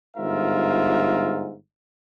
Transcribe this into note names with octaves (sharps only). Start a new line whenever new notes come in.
G1 G#2 F4 A#4 E5